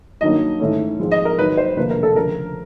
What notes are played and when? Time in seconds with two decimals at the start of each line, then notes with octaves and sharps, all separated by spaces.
0.21 G2 D#3 F#3 A#3 D#4 D#5
0.60 G#2 E3 A3 C#4
0.99 G#2 F3 G#3 C4
1.12 D#5
1.25 A#4
1.38 G#2 D#3 F#3 B4
1.57 C5
1.77 E1 D2 C3 F3 A#3 B4
1.90 A#4
2.03 A4
2.16 D2 C#3 F3 A#4